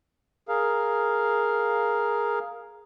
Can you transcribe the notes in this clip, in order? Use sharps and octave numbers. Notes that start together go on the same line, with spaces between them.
G#4 A#4 F5